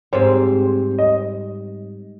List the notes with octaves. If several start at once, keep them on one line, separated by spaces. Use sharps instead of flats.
G#2 G3 C4 C5
D#5